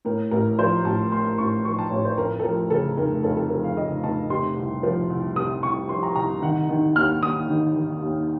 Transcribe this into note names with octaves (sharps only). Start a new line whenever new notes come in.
A2 A#4
A1 A#4
F3 C5
A1 A5
A2 C6
A1 C#6
F3 C#6
A5
A1 C#5
C5
F2 A#4
A4
F3 A#4
C#3 A4
F1 A#4
F2 A4
A4
F3 A#4
F5
C#3 D#5
F1 A5
C3 C6
C2
F3
C2
C3 D#6
C2 C#6
F3 C6
A#5
C2 A#5
D#3 F#5
D#3
D#2 F6
D#2 D#6
D#3
D#3
D#2